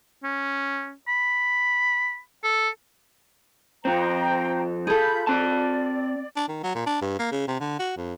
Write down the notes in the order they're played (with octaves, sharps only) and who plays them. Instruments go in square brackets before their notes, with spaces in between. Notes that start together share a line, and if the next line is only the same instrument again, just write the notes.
[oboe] C#4
B5
A4
[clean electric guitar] F2 C4 [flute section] C5 G5 A#5
[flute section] F4 B5 G6 [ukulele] G#4 A4
[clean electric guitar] C4 A5 [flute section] D5
[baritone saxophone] D4
D#3
F#3
A#2
D4
G2
A#3
C#3
C3
D3
F#4
F2